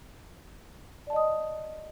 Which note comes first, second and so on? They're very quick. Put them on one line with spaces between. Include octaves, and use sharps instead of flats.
D5 A5 D#5 D#6